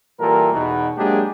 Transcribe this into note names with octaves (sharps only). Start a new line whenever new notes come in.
A#2 E3 G3 A4 A#4
E2 B2 D#4
F#3 G#3 A#3 D4 G4 G#4